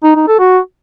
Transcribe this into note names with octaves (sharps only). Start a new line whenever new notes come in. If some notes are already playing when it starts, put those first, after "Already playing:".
D#4
D#4
A4
F#4